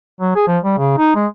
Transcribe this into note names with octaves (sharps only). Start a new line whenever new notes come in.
F#3
G#4
F3
G3
C#3
D#4
G#3